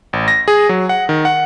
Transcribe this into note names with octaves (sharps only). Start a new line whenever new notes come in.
A1
A#6
G#4
F#3
F#5
D#3
F#5